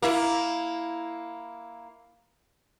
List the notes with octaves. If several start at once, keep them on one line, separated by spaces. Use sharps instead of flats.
A#3 E4